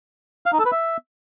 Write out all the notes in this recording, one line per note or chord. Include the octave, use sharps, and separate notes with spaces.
F5
D#4
A4
B4
E5